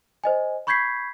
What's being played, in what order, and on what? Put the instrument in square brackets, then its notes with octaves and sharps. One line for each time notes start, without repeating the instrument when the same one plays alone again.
[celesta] C5 D#5 G#5
B5 C#6 G6 G#6 B6 C7